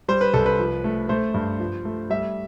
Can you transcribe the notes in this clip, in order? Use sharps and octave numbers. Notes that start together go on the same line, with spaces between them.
G3 C5
B4
C2 A4
B4
F3
A3
A3 C5
G2
F3
A3
G3 E5